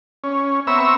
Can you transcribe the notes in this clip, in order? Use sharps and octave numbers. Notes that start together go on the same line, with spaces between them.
C#4
B3 C4 E5 A#5 C#6 E6